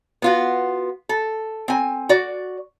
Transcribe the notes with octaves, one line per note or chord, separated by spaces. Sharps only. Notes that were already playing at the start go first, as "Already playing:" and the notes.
B3 F4 F#4
A4
C4 G#5
F#4 D5